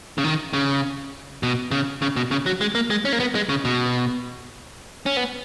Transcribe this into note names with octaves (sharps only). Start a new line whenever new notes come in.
C#3
D#3
C#3
B2
C#3
C#3
B2
C#3
F#3
G#3
A#3
G#3
C#4
A#3
B3
G#3
C#3
B2
C#4
B3